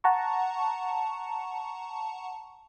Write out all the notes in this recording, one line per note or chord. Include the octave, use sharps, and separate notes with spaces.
F#5 A5 A#5 C#6